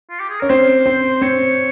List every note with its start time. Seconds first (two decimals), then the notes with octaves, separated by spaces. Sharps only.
0.10 F4
0.20 G4
0.30 G#4
0.40 C#4 A#4
0.50 C4 C5
0.86 C4
1.22 C4 C#5